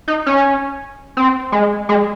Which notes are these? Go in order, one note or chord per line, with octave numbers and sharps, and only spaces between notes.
D#4
C#4
C4
G#3
G#3